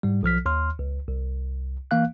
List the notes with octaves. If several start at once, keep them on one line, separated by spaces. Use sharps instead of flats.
G#2 G3
B1 F3 F6 B6
D#2 C6 F6
C#2
C2
E3 A#3 F5 F#6